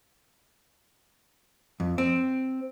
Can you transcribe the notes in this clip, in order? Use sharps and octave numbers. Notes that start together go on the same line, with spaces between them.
F2
C4